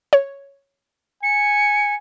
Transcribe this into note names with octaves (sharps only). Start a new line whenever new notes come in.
C#5
G#5 C#7